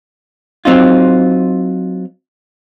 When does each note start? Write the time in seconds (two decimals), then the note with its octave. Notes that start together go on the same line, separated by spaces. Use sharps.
0.65 F#3 C4 D#4 F4